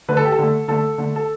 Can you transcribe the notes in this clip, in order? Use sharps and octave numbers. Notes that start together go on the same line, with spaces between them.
D3 A3 B4
A4
G4
A4
D3 A3
D3 A3 A4
D3 A3
A4